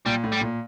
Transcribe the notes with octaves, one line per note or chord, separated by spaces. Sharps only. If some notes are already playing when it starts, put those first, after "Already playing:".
A#2 G3
A2
G3
A#2